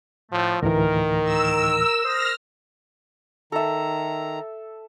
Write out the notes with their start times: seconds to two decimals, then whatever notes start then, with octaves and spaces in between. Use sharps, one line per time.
0.32 A2 F3 A3
0.62 D2 A2 D#3 E3 A#4
1.24 E6
2.04 A#4 C5 D#6 F6 A#6
3.52 D#3 A4 E5 A#5